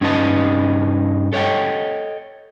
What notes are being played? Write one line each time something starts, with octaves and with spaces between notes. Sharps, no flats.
G2 C#4 D#4 B4 D#5 A5
A4 C#5 D#5 F#5 G5